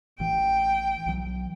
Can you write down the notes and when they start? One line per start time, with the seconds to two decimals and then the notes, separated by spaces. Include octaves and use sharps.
0.20 A1 E3 G5
1.06 B1 E3 F#3